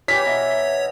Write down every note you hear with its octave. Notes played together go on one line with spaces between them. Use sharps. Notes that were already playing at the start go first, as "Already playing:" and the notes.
E3 G4 C#5 F5 B6
B2 E5 A#5